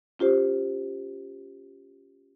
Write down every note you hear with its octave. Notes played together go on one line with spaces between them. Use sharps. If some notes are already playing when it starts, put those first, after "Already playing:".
C#4 F4 G4 C5